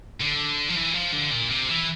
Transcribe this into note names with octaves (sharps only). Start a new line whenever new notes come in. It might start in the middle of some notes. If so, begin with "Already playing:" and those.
D3
F3
E3
F3
D3
A#2
C3
E3